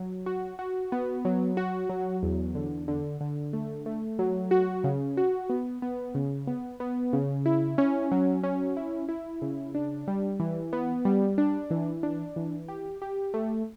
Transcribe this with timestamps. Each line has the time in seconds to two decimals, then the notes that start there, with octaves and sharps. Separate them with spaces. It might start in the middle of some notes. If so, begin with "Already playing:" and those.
Already playing: F#3
0.26 F#4
0.59 F#4
0.92 B3
1.25 F#3
1.57 F#4
1.89 F#3
2.23 E2
2.55 D3
2.88 D3
3.21 D3
3.53 A3
3.86 A3
4.19 F#3
4.51 F#4
4.84 C#3
5.17 F#4
5.50 B3
5.82 B3
6.15 C#3
6.47 B3
6.80 B3
7.13 C#3
7.46 E4
7.78 C#4
8.11 F#3
8.43 C#4
8.77 E4
9.09 E4
9.42 C#3
9.75 D4
10.08 G3
10.40 E3
10.73 B3
11.05 G3
11.38 D4
11.71 E3
12.03 D4
12.36 E3
12.68 G4
13.02 G4
13.34 A3